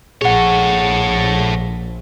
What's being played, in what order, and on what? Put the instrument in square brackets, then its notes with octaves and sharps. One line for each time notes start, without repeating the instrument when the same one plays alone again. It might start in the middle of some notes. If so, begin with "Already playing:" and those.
[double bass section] A#1 [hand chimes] G#4 F#5 [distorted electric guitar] A4 C#5